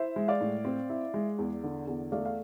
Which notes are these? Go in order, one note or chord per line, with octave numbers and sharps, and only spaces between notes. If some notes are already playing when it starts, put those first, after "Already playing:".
Already playing: E4 C5 E5
G#3
D5 F5
A2
C4
E4
G#3
E2
D3
E2
A3 D5 F5
F5